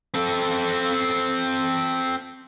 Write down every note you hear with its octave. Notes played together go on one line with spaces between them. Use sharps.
C4 A4